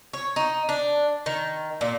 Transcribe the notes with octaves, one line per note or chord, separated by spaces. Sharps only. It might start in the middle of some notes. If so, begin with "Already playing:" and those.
C#5
D#4
D4
D#3
A#2